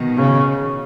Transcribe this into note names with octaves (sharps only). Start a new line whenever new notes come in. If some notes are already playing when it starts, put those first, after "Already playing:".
Already playing: B2 D#3
C#3